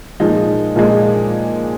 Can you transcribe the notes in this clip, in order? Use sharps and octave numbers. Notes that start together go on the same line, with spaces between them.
A#2 F3 G#3 D#4
A#2 F3 G#3